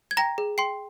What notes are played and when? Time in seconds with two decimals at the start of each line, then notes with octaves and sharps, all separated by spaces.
0.11 G#6
0.17 G5 A#5 A#6
0.38 G#4
0.58 G5 C6 C7